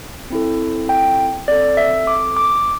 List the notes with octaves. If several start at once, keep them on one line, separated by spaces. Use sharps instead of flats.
C4 E4 A4
G5
C4 A4 D5
E5
D6
D6